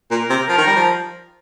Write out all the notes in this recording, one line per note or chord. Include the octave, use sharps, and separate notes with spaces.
A#2 A#4
C3
F3 A#4
D#3
G3
F3